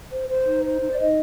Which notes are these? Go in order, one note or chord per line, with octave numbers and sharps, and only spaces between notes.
C5
C5
D#4
C5
D#4
D5
D#4 D#5